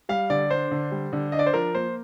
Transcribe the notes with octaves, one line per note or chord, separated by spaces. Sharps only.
G3 F5
D3 D5
D4 C5
D3
G3
D3
D4 D#5
D5
C5
F3 A#4
A#3 C5